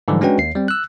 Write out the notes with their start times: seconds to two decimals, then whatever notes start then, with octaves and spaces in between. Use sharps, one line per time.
0.08 G#2 D3 E3 F3 G3
0.21 G#3 C#4 D4 F#4 B4 G5
0.38 D#2 C7
0.55 G3 C4
0.68 E6 F#6